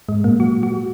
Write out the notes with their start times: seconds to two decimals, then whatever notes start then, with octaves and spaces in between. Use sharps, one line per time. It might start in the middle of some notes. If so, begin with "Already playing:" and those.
0.09 G#2 G#3
0.24 A#2 A#3
0.40 F#3 F#4
0.63 F#3 F#4